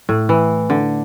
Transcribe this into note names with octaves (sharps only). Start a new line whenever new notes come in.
A2
E3
D3